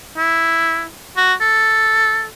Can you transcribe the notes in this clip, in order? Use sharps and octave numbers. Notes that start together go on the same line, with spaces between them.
E4
F#4
A4